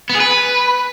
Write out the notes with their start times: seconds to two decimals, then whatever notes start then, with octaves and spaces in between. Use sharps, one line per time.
0.10 B3
0.15 G#4
0.20 B4